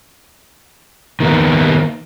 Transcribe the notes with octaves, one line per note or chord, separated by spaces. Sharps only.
D#3 A#3 B3